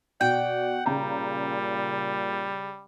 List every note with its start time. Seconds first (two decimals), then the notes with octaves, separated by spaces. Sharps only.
0.21 B2 D5 F#5 G5
0.86 A#2 C#3 G3 A#5